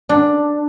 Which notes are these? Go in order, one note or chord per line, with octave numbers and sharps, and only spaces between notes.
D4